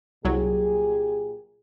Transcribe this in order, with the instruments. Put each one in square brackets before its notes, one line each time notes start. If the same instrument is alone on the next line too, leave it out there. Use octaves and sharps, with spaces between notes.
[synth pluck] C2 F#3 [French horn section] A#2 G4 G#4